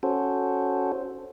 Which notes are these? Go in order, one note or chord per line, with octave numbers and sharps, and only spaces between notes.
C#4 F#4 A4 C5